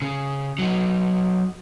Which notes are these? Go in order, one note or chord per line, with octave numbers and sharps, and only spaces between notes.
C#3
F#3 D#4